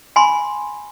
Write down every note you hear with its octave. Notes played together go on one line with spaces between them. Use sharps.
G#5 B5 C6